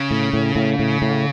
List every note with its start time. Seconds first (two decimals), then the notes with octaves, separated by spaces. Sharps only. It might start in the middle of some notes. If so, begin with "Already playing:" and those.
Already playing: C#3
0.11 A2
0.33 A2
0.56 A2
0.79 A2
1.02 A2